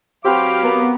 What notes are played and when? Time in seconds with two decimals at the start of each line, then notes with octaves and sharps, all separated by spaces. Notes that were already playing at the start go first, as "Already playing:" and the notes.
0.25 F#3 C4 F#4 G4 B4 F5 D6 F6
0.63 B3 A#4 G5 A#5